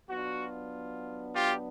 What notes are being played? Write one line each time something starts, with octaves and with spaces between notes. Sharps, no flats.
F#3 B3 D4 F4 F#4
F4 G4